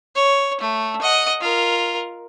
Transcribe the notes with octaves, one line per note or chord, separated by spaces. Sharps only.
C#5
A3
D#5 F#5
F4 A#4